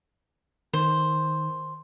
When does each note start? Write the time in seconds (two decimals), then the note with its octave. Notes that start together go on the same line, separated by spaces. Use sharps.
0.73 D#3 C5